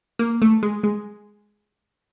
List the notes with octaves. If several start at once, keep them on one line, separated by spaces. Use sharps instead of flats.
A#3
A3
G#3
G#3